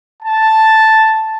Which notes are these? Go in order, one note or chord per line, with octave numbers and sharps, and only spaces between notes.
A5